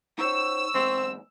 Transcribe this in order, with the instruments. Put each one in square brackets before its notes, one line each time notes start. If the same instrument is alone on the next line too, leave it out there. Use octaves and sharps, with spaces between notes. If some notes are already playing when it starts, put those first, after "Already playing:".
[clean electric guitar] D#4 C5 C#5 [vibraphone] C#6 [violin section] E6
[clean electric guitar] E2 G#2 G#3 [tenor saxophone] C4